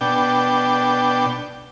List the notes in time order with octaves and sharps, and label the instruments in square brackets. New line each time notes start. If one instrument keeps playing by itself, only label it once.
[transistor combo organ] B2 D4 G5